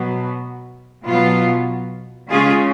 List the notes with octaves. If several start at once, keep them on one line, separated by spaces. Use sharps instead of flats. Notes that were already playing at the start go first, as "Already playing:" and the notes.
Already playing: B2 F#3 B3
B2 F#3 B3 F4
C#3 G#3 C#4 F4 G#4